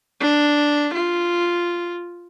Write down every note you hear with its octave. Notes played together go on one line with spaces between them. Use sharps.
D4
F4